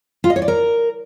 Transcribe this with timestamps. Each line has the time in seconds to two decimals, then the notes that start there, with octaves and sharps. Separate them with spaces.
0.24 F4
0.30 D#5
0.36 C#5
0.42 D5
0.48 A#4